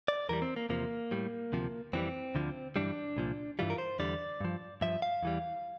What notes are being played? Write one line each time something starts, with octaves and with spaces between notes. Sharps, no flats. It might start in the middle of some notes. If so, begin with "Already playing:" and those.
D5
E2 E3 G3 A#4
C4
A#3
E2 C3 F3 A#3
A2 G3
D2 C3 F3
F2 E3 G3 C4
D2 D3 F3
G2 E3 G3 D4
C2 A#2 F3
G2 E3 G3 F4
A#4
C5
E2 D3 G3 D5
G2 F3
G2 F3 E5
F5
E2 E3 G3